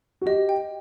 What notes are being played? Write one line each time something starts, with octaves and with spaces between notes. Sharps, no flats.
F#4
G4 D#5
G5